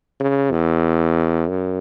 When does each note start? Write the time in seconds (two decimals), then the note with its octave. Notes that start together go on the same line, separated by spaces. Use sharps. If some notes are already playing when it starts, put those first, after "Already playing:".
0.20 C#3
0.52 E2
1.48 F#2